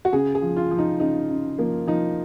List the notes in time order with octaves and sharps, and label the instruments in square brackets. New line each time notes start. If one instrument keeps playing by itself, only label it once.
[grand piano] F#4
C#3 G#4
G#4
F3
F4
F3
D#4
C#3 D#4
C#3
F3 A#3
F3 D#4